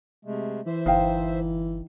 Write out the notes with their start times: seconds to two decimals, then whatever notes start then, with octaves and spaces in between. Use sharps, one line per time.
0.25 C3 G#3 A3
0.66 E3 C5 E5
0.86 G1 D#4 F5 G5